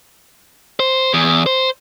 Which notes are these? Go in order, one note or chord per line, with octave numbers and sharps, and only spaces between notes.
C5
E2
C5